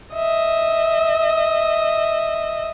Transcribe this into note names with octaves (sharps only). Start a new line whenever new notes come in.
D#5 E5